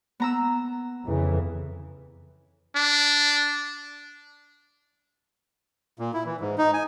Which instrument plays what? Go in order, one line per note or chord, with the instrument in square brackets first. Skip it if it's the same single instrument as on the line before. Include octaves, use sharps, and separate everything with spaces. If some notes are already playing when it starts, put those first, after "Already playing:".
[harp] B3 A#5 E6
[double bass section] F2 C#3 E3
[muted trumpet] D4
[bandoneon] A#2
E4
E3
G#2
D#4
G#5